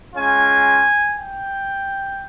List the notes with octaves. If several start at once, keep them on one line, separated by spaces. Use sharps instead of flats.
G#3 C#4 F4 G#5
G5